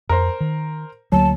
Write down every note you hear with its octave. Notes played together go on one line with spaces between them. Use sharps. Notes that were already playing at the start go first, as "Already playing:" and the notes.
F2 A#4 C5
D#3
D2 F#3 A#3 A5